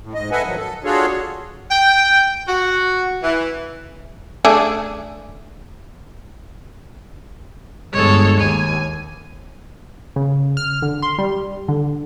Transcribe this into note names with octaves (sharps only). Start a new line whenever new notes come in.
A2
G#2 D#5
A4 B4 D#5 E5 F#5 G#5
D#3 F3 F#3
A4
D4 F4 F#4 G#4 A4 C#5
G5
F#4
E3
A3 D4 G#4
G1 G#3 A4 C#5
D#2 G#5
C#3
F6
D3
C6
G3
D3